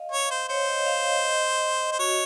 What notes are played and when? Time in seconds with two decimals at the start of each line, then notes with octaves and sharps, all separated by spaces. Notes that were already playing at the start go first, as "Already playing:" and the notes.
Already playing: D#5 F5
0.12 C#5
0.31 C5
0.49 C5 C#5
0.68 D#5
0.86 F5
1.06 D#5
1.24 D#5
1.92 C5
1.99 F#4 C#5